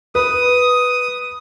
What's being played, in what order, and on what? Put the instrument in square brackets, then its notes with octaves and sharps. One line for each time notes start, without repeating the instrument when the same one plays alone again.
[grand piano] B4 [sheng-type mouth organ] D#6